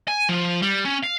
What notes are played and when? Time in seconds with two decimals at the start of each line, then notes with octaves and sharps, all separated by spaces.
0.08 G#5
0.29 F3
0.62 G3
0.85 C#4
1.03 F5